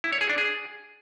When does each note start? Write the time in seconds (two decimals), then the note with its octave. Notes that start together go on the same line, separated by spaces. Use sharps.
0.04 E4
0.13 C#5
0.21 G#4
0.29 D4
0.38 G#4